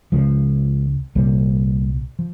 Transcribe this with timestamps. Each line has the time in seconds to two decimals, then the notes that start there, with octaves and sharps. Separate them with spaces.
0.12 C#2 C#3 F3 G#3
1.15 C2 A#2 G3 A#3
2.19 F3